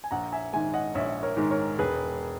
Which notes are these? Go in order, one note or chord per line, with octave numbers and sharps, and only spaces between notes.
G#5
A#1 F#5 A#5
E5 G#5
G#2 D#3 G#3 E5 G#5
D#5 F#5
A#1 C#5 E5
A#4 C#5
G#2 D#3 G#3
A#4 C#5
E1 G#4 B4